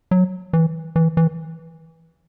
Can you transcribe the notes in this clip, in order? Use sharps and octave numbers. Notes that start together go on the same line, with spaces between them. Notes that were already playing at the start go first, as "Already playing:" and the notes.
F#3
E3
E3
E3